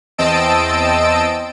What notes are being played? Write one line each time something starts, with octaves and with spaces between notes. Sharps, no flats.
E2 C4 D#5 A5 E6 D7